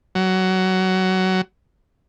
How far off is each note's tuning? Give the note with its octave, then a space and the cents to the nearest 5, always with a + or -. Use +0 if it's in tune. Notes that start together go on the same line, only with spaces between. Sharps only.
F#3 +15